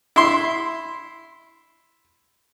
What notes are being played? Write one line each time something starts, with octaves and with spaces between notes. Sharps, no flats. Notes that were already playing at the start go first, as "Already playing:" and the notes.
E4 C6